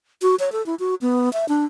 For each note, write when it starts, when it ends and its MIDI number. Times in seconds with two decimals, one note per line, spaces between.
0.22 0.35 66
0.40 0.52 73
0.52 0.65 69
0.66 0.75 64
0.79 0.95 66
1.01 1.32 59
1.33 1.48 76
1.49 1.65 62